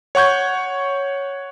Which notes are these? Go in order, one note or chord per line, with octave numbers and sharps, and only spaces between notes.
C#5 F#5 C#6 G6 G#6